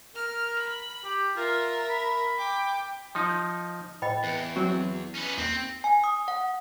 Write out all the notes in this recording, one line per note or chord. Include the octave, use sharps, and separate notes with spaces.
A#4 F6
B5
G4
F4 A#4 E5
B5
G5 D6
F3 D#4
A2 D#5 G5 B5
E2 B4
F#3 C4 F#4
C#4 B4
D#2 C4
G#5
D#6
F#5